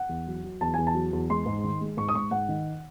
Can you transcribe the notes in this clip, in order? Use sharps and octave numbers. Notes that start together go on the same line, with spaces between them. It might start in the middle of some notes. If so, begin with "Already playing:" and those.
Already playing: F#5
E2
F#3
F#3
E2 A5
E2 G#5
A5
F#3
E2
G#3 C6
G#2
D#3
G#3
G#2 C#6
D#6
G#2 C#6
G#2 F#5
D#3